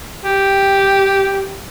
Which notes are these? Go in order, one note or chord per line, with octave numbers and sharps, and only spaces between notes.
G4